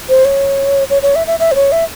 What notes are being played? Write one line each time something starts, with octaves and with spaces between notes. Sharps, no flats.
C5
C#5
C#5
C#5
E5
E5
E5
C5
C#5
E5